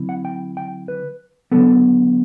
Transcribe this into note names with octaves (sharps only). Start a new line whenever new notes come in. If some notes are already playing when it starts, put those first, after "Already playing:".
Already playing: D3 F#3 C4 E4
F#5
G5
G5
B4
D3 F#3 B3 A4